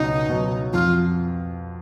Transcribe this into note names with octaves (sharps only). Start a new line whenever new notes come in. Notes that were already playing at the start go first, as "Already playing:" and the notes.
Already playing: C#2 B2 F#3 D#4
B2 F#3
F2 F4